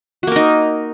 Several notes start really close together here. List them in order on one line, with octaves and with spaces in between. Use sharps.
F#4 A#3 A#4 D#4